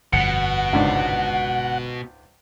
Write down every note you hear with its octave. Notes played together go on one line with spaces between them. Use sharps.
G1 F2 B2 F#5
C#2 G#2 D4